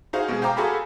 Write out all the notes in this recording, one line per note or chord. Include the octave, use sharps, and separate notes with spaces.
D#4 F#4 G#4 C5 F5 G#5
B2 G#3 G#4
C5 F5 G5 A#5 D6
F#4 G#4 A4 F5 G#5 B5